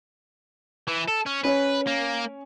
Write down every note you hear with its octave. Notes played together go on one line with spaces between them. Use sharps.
E3
A4
C#4
C#4 B4 C#5
A#3